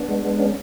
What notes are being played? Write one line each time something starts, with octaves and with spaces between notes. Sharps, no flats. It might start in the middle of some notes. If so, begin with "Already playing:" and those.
Already playing: B3 D4
G#3
G#3
C#4